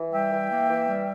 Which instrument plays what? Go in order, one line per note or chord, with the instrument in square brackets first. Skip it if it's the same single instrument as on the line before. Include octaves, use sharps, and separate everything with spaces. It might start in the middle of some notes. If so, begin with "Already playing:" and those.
Already playing: [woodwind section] E3
G3 E5 G5
E3
A#3
E3
G3